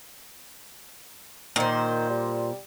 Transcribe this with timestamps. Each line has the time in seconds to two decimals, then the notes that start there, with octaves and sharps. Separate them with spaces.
1.56 A#2 D#3 C5
2.10 G3